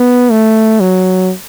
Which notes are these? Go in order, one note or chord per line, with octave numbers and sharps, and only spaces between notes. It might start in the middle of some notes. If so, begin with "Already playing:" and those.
Already playing: B3
A3
F#3